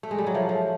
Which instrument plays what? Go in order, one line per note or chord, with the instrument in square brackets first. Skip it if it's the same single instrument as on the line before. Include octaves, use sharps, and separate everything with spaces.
[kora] A3
G#3
G3
F#3
[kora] F3 [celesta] A4 C#5 E5 A5
[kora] F3